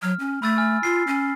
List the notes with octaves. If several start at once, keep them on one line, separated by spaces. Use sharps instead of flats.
F#3 F6
C#4
A3 B5 E6 A6
G#5 F6
F4 C7
C#4